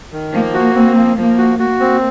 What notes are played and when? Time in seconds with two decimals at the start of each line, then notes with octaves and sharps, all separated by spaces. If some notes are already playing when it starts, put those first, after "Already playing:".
0.12 D#3
0.33 F3 A#3
0.54 F#4
0.75 C4
0.96 F3
1.17 F3 A#3
1.38 F#4
1.59 A#3 F#4
1.80 C4